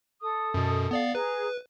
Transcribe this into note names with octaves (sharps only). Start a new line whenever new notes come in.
A4 D#6
F#2 B2
B3 D5 F5
G#4 B4 A#5